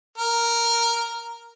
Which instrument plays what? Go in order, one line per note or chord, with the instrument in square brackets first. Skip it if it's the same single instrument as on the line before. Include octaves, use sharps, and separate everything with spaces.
[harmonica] A#4